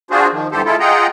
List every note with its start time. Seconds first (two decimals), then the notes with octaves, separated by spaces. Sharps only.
0.11 D4 F4 F#4 G#4 C5
0.32 D#3 F3
0.52 G2 D3 E3 G4 A4 C5
0.65 G#3 E4 F4 A4
0.80 F4 G#4 D#5 F#5 G5 A#5